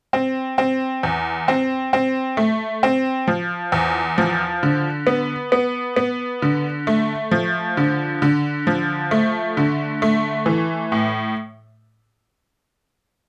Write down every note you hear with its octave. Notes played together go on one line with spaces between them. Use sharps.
C4
C4
E2
C4
C4
A3
C4
F3
E2
F3
D3
B3
B3
B3
D3
A3
F3
D3
D3
F3
A3
D3
A3
E3
A2